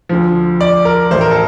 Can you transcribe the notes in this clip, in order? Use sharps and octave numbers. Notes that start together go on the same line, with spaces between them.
D2 D3 F3
D5
A#4
A1 A2 A3 C5
A#4
A4